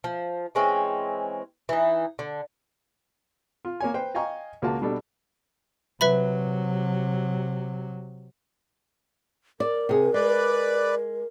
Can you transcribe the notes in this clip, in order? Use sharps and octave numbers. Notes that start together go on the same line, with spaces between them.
F3
E3 G#3 C4 C#4
E3 D#4
D3
F4
A#3 C#5 G#5
B4 C5 G5
D#5 F5 G5 G#5 A#5 C#6
C#2 A#3 F4 F#4 A5
B2 G3 D4 A4
C3 F#3 B4 E5 B5
A#4 D5
C3 G#4
G#3 B4 D5